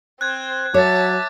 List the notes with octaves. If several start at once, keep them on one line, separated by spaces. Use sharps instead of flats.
C4 C5 F#6 G#6
F#3 C#5 E5 A5 D6 A6